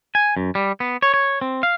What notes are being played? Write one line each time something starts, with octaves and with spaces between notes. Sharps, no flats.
G#5
F#2
G3
B3
C#5
C#5
C4
F5